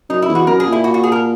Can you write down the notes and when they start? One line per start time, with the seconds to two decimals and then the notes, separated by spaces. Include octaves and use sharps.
0.09 F#2 D#4
0.22 E4
0.29 E2
0.35 F#4
0.47 F#2 A#4
0.60 G#4
0.66 A#2
0.72 E4
0.84 F#4
0.94 F#4
1.03 G#4
1.12 A#4